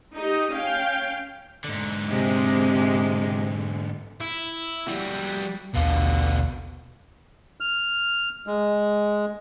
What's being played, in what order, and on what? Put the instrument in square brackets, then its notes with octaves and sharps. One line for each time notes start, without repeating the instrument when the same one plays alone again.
[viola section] D#4 G4 D#5
C#4 F5 G5
[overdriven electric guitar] G#2 D3
[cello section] C3 G#3
[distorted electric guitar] E4
G3 F#4
[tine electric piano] A#1 D#2 F5 [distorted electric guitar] B2 D3
[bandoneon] F6
G#3